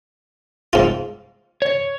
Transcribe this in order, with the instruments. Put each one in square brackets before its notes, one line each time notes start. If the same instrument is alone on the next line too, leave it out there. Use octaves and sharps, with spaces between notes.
[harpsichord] G#2 F4
[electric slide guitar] C#5